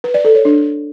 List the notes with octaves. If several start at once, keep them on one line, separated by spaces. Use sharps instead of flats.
B4
D5
A4
C#5
D4